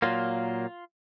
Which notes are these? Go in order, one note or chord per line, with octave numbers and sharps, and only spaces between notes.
A#2 F#3 A#3 F4